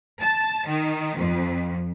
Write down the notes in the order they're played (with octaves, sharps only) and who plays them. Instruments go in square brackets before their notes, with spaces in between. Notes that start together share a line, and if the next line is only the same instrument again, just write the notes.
[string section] A5
D#3
F2